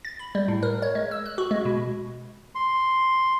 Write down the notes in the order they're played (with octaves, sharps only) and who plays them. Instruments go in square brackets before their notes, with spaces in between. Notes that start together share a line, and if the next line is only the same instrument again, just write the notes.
[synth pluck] A6
B5
G3
A2
A#4
C#5
G#3
E6
F#6
F#4
G#3
B2
[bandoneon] C6